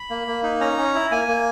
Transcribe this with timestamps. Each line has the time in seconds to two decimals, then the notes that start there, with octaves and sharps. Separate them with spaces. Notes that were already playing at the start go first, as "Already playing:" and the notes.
Already playing: B5
0.10 A#3
0.28 A#3
0.43 D#4
0.60 C#4 A#5
0.78 C#4
0.95 E4
1.11 A#3 G#5
1.28 A#3